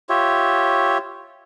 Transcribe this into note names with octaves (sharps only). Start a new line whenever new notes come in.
F4 G4 C#5 E5